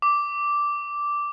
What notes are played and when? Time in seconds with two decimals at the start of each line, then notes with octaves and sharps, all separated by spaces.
0.02 D6